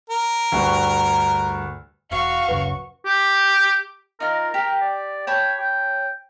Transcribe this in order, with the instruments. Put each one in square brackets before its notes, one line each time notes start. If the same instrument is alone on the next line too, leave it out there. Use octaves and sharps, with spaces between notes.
[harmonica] A#4
[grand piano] D2 G2 C#6
[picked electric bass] E1 [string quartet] F#4 C#6 [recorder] F5
[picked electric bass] D1 F#2 C#3 [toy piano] B4
[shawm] G4
[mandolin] D#4 F4 [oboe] A#4
[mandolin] G4 [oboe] A#4
[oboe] D5
[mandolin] C#5 A5 B5 [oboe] G5
[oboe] G5